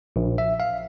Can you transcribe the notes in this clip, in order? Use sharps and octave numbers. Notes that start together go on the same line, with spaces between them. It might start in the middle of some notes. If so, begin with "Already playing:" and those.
A#1
E5
F5